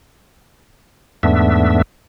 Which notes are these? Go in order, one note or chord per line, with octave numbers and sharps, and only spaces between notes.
E2 G#2 A3 B3 D4 E5